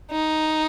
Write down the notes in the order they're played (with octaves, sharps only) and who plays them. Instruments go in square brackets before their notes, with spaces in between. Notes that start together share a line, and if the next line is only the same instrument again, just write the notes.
[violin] D#4